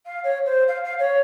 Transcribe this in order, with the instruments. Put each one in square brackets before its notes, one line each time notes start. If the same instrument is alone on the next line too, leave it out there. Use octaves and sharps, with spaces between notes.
[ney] F5
C#5
C5
F5
F5
C#5